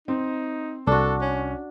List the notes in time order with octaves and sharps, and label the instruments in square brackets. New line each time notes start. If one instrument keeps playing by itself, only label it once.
[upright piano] C4 [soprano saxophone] D#4
[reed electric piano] C2 [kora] D4 F#4 [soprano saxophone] A4
[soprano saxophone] C#4